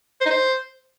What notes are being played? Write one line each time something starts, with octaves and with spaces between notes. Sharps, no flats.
C5
D#4
C5